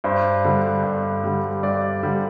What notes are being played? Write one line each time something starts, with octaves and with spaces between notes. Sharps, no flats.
G2 C5
D3 G3
G2
D3 G3
G2 D5
D3 G3